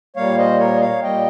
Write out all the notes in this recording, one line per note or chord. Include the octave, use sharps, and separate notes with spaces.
A#2 G3 A#3 C#5 F5
C5 D#5
A#4 C#5
D#5
C#5 F5
A#2 G3 A#3 D#5 G5